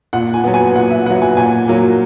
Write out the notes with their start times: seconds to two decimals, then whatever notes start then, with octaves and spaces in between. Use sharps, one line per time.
0.13 A#2 F#5
0.34 G#5
0.44 F#3 B3
0.54 G#5
0.75 A#2 F#5
0.90 E5
1.06 F#3 B3 F#5
1.22 G#5
1.37 A#2 G#5
1.68 F#3 A#3